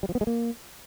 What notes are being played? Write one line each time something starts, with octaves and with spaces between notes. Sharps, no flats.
G3
F3
B3
G#3
A#3